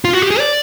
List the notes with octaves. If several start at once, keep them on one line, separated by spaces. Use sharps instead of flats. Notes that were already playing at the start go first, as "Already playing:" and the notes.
F4
F#4
G4
G#4
D5